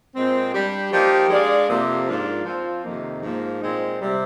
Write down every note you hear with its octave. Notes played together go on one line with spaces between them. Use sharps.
A#2 G#3 C4
G3 D4 G4
F3 A#3 D#4 G4
G#3 D4 G#4 D5 F5
F2 C3 F3 A#3
G#2 F3 A#3 D4 F4
F3 C4 F4
F2 C3 D#3 A#3 D#4
G#2 F3 A#3
A#2 G#3 C4 D#4
C3 G3